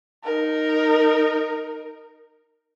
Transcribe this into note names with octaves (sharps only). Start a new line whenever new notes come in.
D#4 A#4